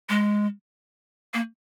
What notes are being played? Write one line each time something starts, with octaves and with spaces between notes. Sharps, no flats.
G#3
A#3